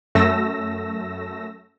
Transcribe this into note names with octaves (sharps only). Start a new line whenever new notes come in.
F#2 A3 E6 A#6